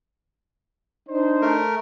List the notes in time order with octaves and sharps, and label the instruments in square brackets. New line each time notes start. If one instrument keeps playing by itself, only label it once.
[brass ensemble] D4 D#4 C5
[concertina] A3 A#4